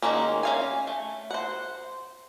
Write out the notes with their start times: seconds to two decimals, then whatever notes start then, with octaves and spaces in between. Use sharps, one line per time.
0.02 D#3 G#3 A#3 C#4
0.43 C#4 F5 G#5
0.87 A3
1.31 C5 F#5